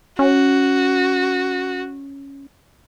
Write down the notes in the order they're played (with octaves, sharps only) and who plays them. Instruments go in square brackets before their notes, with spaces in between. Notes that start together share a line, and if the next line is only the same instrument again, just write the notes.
[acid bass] C#4 [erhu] F#4